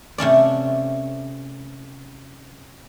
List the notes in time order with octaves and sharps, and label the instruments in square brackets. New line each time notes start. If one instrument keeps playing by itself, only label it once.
[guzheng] C3 A3 C#4 D5